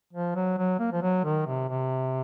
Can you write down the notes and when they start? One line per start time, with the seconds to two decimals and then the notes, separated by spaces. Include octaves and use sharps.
0.13 F3
0.36 F#3
0.58 F#3
0.79 A#3
0.92 F3
1.02 F#3
1.24 D#3
1.46 C3
1.69 C3